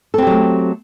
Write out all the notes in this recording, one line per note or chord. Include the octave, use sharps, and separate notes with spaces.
F#3 A3 C4 G4 A4